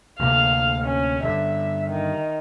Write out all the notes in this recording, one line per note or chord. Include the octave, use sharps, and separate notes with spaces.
D2 C3 A#3 F5
C#4
G2 D3 E5
D#3